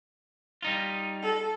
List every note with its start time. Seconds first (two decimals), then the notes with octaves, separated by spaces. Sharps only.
0.62 G3 D#4 F4
1.22 A4